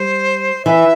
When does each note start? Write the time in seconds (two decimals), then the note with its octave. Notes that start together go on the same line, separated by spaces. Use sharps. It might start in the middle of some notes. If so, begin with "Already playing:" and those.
Already playing: G3 C5
0.65 E3 E5